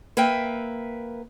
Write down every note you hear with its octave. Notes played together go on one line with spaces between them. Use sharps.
A#3 B4 E5 G5